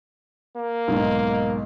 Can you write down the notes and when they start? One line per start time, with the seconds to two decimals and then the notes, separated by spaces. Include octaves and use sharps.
0.56 A#3
0.88 B1 G#2